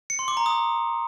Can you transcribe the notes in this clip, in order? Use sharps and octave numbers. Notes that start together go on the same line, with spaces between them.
C#7
C6
D6
A#5
D#6